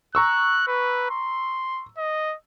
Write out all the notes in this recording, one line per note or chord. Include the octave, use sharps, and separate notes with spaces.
A#5 C#6 E6 F#6
B4
C6
D#5